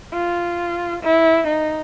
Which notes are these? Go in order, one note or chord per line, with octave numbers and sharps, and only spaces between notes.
F4
E4
D#4